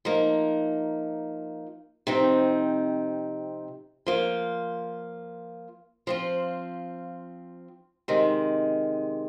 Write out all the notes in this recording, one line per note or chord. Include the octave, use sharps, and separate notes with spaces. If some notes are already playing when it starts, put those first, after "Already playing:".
F3 A#3 D#4
C3 F3 C4 D#4
F3 A#3 F4
F3 C4 F4
C3 D#3 G#3